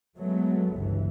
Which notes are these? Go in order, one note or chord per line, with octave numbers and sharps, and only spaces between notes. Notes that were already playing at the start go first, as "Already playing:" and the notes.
F#3 G#3 A3 B3
G1 C#2 G2 E3